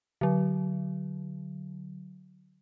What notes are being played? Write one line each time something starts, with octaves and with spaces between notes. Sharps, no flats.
D3 F#3